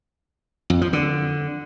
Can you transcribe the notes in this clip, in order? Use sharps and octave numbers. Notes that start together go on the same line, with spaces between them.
F2
F3
D3